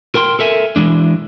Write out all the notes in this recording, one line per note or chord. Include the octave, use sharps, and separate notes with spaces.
A#4 G5 C6
A4 A#4 E5 G5 G#5
E3 F#3 G#3 D4